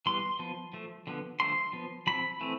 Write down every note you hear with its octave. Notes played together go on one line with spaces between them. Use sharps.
E3 G3 B3 C6
F3 B3
F3 A3
D3 F3 B3
D3 F3 A3 C6
F3 B3
F3 C4 B5
E3 A3 C4